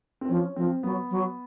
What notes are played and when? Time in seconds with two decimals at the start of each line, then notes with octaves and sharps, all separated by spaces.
0.21 C4
0.29 F3 C#4
0.56 F3 C4
0.83 F#3 B3
1.11 F#3